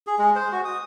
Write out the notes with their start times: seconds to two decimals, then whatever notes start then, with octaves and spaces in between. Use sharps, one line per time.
0.07 G#4
0.18 G#3
0.35 C5
0.52 F#4
0.65 D#6